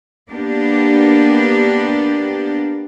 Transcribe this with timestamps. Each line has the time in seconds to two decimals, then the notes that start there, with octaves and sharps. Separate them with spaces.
0.30 A#3 B3 D4 G4